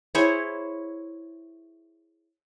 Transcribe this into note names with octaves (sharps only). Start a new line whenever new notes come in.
E4 G#4 C5 C#5